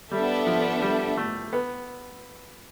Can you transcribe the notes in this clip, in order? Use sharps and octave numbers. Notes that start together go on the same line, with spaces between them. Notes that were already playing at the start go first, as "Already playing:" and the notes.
G3 B3 D4 A4 E5
F3
G3
A3
B3